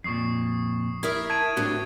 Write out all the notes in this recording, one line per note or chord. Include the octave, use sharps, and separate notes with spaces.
F2 A#2 C#6 D#6 C7
E4 A#4 E5 D#6 G#6
A5 G#6 D7 D#7
A2 A3 C4 D4 F#4 G4